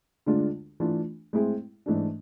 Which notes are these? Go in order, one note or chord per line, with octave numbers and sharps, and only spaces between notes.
D2 D3 G#3 D4 F4
E3 A3 D4 F4
A2 G#3 C4 E4 G#4
G#2 E3 A3 D4